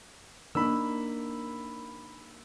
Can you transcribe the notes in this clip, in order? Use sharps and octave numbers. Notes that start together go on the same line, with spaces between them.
A#3 D4 D#4 B5 E6